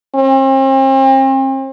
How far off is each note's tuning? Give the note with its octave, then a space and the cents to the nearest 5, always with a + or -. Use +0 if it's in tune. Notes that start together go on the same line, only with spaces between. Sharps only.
C4 +40